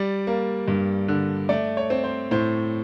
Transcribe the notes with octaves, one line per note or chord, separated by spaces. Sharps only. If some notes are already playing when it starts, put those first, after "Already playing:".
Already playing: G3 D5
A#3
G2
D3
A3 D5
C#5
C4
C5
A2 C5